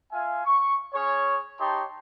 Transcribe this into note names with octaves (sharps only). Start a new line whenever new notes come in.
F4 E5 G#5
C#6
C#4 G#4 C#5
D#4 G4 C#5 A5 C6